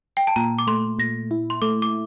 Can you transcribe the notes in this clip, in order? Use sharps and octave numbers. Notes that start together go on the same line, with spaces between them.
G5
A5
A#2 A#5
D6
A3 C6
A#2 A#6
E4
C6
A3 D6
D6